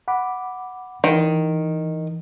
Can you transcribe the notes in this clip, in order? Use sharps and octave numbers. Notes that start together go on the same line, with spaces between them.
F#5 B5 D6
D#3 E3